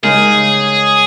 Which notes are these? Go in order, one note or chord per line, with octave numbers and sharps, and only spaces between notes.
C#3 G#3 D#4 G#4 A#4